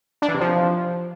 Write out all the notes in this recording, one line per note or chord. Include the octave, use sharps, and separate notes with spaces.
D4
E3
C3
F3